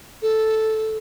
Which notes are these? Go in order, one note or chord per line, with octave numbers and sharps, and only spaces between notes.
A4